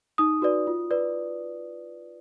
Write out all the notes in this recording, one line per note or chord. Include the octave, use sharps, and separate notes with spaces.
D#4 D#6
F#4 B4 D5
F4
B4 D5